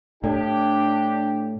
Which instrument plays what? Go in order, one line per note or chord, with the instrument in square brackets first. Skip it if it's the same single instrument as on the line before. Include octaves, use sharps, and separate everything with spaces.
[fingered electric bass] A2 [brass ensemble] D4 G4